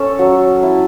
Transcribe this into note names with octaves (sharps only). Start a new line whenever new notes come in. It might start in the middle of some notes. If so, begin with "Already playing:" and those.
Already playing: C#4 A4
F#3
E4